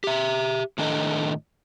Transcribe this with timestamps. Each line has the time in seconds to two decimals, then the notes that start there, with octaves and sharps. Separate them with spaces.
0.04 G4 E5
0.78 A2 D#3 D4 A4 D#5